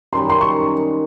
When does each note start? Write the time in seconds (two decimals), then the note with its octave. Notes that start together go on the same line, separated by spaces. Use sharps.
0.13 F#2 D#3 G3 C6
0.30 C6
0.41 C#6